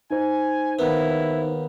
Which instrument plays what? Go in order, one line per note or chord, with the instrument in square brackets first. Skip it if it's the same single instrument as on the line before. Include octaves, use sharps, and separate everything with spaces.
[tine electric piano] D#4 C5 [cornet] G#5
[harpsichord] D#2 B3 [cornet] E4